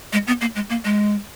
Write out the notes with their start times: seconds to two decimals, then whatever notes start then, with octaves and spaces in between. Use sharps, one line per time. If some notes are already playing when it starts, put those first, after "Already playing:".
0.13 G#3
0.27 B3
0.41 A#3
0.55 G#3
0.70 A#3
0.85 G#3